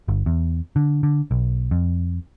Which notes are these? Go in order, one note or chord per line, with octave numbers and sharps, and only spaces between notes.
G1
E2
D3
D3
B1
F2